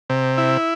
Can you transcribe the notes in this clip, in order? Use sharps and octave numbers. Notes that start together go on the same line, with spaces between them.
C3
E4